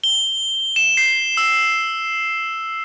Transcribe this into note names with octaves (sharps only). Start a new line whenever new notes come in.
G7
E7
C7
E6